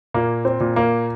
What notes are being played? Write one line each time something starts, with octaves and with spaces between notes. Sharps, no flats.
A#2 A#3
C4
A#2
A#3